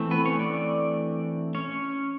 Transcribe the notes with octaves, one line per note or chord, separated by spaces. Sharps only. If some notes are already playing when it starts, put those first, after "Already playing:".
Already playing: E3 A3 C4
B3 B4
C#4 C#5
D4 D5
C#4 C#5